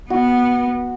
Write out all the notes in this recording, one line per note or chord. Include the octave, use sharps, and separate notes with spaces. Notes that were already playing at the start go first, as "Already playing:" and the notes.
B3 F#4